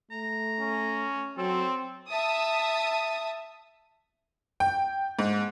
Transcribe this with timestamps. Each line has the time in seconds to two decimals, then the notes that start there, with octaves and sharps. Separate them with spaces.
0.11 A3 A#5
0.60 C#4
1.37 F#3 C4 A4
2.09 E5 A5 D#6
4.60 G5
5.19 G#2